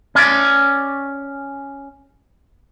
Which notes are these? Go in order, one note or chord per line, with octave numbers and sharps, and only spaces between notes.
C#4 D5